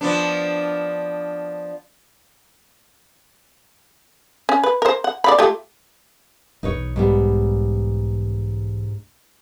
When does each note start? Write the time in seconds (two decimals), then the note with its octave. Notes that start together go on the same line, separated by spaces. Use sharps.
0.01 F3 B3 D4
4.49 C#4
4.64 B4
4.82 A#4 C5
5.04 F#5
5.24 D5 F5 B5
5.38 A3 F4 G4
6.63 B1 E2 D#4 B4 C#5
6.96 G#2 G3 B3